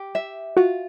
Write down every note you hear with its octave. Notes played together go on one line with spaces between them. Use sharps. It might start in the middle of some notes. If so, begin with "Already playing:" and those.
Already playing: G4
E5
F4 F#4